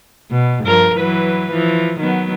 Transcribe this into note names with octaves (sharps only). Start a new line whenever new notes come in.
B2
G2 F3 A#4
E3 F#3 B4
E3 F3
D#3 F#3 B3